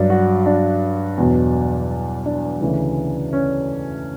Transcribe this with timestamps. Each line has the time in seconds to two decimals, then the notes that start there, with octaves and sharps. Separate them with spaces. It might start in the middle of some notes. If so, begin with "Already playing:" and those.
Already playing: G2 F#3 D4
0.10 F#4
0.46 D4
1.17 E2 B2 F#3
2.26 D4
2.61 D2 C#3 E3
3.33 C#4